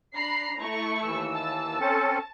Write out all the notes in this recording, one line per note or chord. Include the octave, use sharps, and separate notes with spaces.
D4 A#5 B5 C7
A3 E4 C#6
D#2 E3 E6
A5
C4 C#4 A4